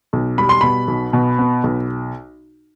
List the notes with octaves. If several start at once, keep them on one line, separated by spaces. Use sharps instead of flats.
B1
G3 B5
C6
B2 B5
B1
B2
B3
B1